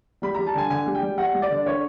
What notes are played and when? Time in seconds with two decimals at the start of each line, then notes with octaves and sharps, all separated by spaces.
0.22 G3 B5
0.34 G3 A#5
0.47 A5
0.55 D3 G#5
0.70 D3 G#5
0.86 G3
0.95 G5
1.02 G3
1.18 G3 F#5
1.34 G3
1.42 D5
1.50 D3
1.66 D3 C#5